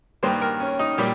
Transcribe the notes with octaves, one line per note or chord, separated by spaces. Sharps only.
G2 D#3 G3 A#3 C5
A#4
C#4
D#4
A#2 G3 G4